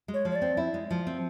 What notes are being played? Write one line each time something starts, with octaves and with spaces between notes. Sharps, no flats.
G#3
C#5
F3
C#5
D5
C4
E4
G#3
F3
C4